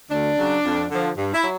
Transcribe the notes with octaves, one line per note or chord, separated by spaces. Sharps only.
D2 D4
C#3 F#3
F2
D3 F3
G2
E4
F#3